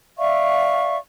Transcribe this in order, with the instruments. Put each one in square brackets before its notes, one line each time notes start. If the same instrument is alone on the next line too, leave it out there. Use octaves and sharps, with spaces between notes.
[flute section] D5 E5 F5 C#6